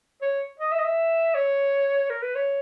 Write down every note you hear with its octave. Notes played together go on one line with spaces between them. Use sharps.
C#5
D#5
E5
D#5
E5
C#5
A#4
B4
C#5